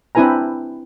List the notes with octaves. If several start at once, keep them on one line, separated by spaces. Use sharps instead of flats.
C4 D4 E4 B4 G#5 A#5